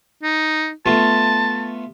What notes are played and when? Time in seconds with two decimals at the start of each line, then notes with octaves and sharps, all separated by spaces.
0.23 D#4
0.86 A3 B3 F4 A5